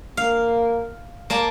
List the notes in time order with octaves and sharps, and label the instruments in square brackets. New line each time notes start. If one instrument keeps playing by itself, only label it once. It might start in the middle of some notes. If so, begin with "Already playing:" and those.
[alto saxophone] A#3 [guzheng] F5
[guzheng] A#3 D5 A5